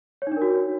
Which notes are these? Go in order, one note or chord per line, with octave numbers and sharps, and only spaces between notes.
D4 D#4 F#4 A#4 C#5